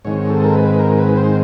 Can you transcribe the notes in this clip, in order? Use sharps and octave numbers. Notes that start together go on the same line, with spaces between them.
G#2 D#3 G#3 C4 C#5
A4
A#4
B4
A#4
B4
C5